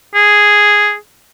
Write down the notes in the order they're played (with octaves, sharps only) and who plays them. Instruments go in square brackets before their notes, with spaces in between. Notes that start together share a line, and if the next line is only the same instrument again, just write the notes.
[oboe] G#4